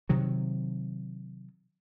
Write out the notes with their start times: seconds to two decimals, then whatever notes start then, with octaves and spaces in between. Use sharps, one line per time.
0.09 C3 D#3 F#3